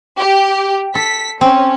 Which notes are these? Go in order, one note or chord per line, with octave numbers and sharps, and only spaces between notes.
G4
A4 B6
C4 C#4